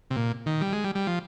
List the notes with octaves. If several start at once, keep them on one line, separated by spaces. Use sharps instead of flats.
C3
A#2
D#3
G3
G#3
G3
G3
F3